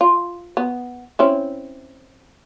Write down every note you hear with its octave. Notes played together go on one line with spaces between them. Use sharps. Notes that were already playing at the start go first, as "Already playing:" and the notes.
F4
B3
C4 C#4 E4